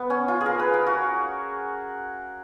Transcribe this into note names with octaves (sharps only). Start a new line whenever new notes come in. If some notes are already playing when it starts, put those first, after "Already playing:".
Already playing: B3
C#4
F4
G#4
A#4
B4
A#4
F#4